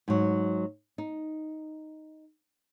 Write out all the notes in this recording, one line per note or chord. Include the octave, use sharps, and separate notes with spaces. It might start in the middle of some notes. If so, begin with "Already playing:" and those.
G#2 F#3
D#4